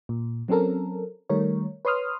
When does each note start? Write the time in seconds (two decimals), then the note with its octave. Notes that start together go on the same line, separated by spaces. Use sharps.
0.09 A#2
0.48 F#3 C4 C#4 A4 A#4
1.30 D#3 G3 A3 A#4 C#5
1.85 B4 C#5 C6 D#6 F6